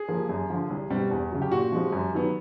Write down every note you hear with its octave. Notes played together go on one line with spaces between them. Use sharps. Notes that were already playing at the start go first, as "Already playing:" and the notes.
Already playing: G#4
F3 A#3
F#2
D3 F3
C2
B2 G3 C4
E2
C#3 F#3
G4
A#2 F#4
F3 G#3 C4
F#2
D#3 F#3 B3